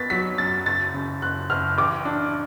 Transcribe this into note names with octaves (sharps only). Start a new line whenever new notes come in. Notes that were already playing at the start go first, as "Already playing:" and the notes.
Already playing: B3 A6 B6
F#3 B6
F#2 A6
F#1 A6
C#3
F#1 F#6
F#1 F6
A1 D6
D4